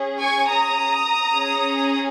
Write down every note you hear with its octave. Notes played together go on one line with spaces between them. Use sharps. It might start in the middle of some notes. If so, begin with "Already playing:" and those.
Already playing: C#4 G#4
G#5 C#6
A#5 D#6
C#4 G#4